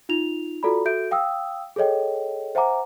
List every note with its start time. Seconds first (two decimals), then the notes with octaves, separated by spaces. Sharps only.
0.09 D#4 F4 F7
0.63 F4 F#4 A4 D5 A#5 B5
0.85 F#4 A4 E5 G6 D7
1.11 F5 G5 D#6 E6
1.76 G#4 A4 C#5 D#5 G5
2.55 C5 E5 F#5 G#5 A#5 D6